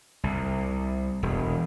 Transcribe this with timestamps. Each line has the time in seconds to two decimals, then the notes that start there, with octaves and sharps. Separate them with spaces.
0.23 C2
1.23 E1